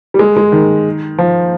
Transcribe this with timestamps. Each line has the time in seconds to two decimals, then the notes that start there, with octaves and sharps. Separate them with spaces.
0.14 G3
0.19 G#3
0.37 G#3
0.52 D#3
1.18 F3